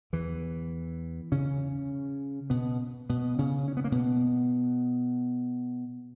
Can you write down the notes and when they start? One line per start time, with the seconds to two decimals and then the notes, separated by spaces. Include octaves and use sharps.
0.13 E2 E3
1.32 C#3 C#4
2.50 B2 B3
3.09 B2 B3
3.39 C#3 C#4
3.68 C#4
3.77 B3
3.84 A#3
3.92 B2 B3